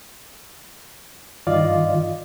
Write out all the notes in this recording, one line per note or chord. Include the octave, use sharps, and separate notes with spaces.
G2 D#3 F4 D5 D#5 F5